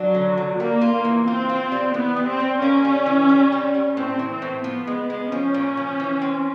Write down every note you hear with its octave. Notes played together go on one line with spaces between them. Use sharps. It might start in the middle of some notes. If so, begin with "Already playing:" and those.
Already playing: F#3 D4
D3
D3
G3 A#3
F4
A#3
E3
C4 F4
F4
G3
E3 B3
G3
C4
G3
A#3 C#4
G3
E3
G3
G3
G3
A2 C4
E3
C4
A2
F3 B3
G#3
G#3
F3 C#4
A#2
F3
E3
C4